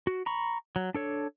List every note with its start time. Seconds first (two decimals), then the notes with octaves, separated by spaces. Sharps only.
0.07 F#4
0.26 A#5 B5 C#6
0.76 F#3
0.95 D4 A4 C#5